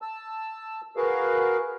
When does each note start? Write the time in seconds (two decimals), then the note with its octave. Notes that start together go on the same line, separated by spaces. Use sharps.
0.02 A5 E6
0.96 F#4 G#4 A#4 B4 F5